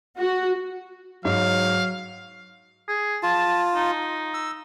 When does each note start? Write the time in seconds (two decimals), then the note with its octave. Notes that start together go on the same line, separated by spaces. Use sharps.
0.18 F#4
1.25 G#2 F#3 F5
2.88 G#4
3.23 F4 A5
3.75 D#4
4.34 E6